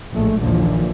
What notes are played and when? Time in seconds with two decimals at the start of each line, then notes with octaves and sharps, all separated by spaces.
0.11 A#1 A2 G#3 A3
0.39 A#1 D#2 A#2 D3 E3 F3